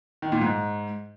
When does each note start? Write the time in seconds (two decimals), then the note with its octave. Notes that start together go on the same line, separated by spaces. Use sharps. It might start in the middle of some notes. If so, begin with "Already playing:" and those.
0.22 D#3
0.32 A#2
0.42 G#2